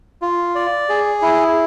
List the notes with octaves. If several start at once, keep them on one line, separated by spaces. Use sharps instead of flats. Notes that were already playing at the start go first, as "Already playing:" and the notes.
F4
D5
G#4
E4